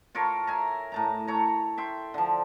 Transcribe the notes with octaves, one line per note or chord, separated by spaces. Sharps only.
F4 A4 A#4 C#5
E5 G#5 A#5
A2 A5 A#5
A4 C#5 A#5
E5 G5 C6
D3 F3